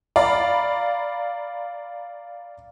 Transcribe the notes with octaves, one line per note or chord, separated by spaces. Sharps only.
D5 F5 A#5 B5